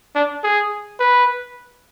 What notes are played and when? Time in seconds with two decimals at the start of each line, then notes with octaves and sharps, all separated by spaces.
0.15 D4
0.44 G#4
0.99 B4